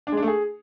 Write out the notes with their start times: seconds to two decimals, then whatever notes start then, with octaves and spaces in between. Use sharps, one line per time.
0.07 D4
0.12 G#3
0.17 D4
0.22 A3
0.28 G#4